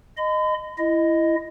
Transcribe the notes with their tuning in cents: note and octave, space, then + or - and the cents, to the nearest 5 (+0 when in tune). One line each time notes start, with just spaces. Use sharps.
D#5 -10 B5 +45
E4 +15 D#5 +0